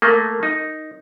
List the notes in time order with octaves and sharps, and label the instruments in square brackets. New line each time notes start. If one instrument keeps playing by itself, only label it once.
[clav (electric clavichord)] A3 A#3 [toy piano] A#4
[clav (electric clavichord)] D#4